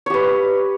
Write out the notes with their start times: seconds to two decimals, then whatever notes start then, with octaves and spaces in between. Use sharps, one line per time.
0.06 C#5
0.10 G4
0.14 B4